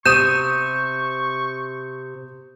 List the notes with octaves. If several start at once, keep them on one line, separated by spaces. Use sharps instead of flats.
C3 C#6 D#6 G6 D#7 E7